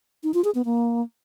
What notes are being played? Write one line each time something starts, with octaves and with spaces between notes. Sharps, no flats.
D#4
F4
G#4
B3
A#3